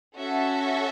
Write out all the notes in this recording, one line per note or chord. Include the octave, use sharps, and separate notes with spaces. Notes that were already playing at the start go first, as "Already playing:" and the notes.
C#4 F#4 A4 E5